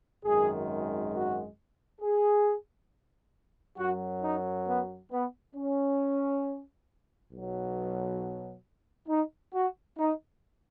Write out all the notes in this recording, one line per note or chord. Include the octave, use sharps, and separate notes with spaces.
G#1 F#2 D#3 G#3 G#4
F#4
G#4
F#2 F#3 F#4
D#4
B3
B3
C#4
B1 B2 F#3
D#4
F#4
D#4